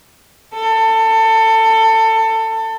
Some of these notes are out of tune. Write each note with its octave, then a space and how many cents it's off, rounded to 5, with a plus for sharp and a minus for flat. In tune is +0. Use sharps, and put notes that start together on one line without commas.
A4 +25